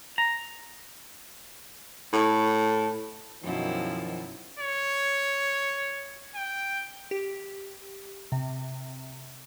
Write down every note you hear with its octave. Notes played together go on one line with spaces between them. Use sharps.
A#5
A2
F#2 B2 D#3 F3 E4
C#5
G5
G4
C3